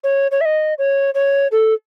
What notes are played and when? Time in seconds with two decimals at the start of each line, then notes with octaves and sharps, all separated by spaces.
0.04 C#5
0.31 C#5
0.41 E5
0.45 D#5
0.78 C#5
1.15 C#5
1.52 A4